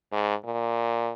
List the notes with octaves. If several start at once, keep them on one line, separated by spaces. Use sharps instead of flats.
G#2
A#2